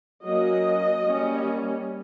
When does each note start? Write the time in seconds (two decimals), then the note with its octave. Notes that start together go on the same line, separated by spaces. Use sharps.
0.23 F#3 A#3 C#4 D#5
1.05 G3 A#3 C#4